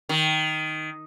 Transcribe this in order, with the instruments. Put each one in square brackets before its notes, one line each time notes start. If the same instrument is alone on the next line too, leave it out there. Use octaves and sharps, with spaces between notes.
[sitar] D#3